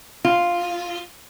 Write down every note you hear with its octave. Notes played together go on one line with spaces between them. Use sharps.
F4